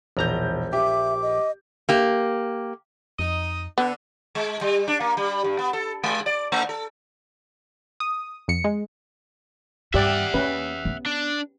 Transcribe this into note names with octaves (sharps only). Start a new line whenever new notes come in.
E1 A#1 A#5 G6
G4 E5 D6
D#5
A#3 G4
F2 D#4 D#5
D3 B3
G#3
G3
D4
A#3
G3
G2
B3
A4
G#3
D5
A3
A4
D#6
F2 C#7
G#3
G2 G4 D5 E5 F#5
A#3 C#4 B4
B3
D4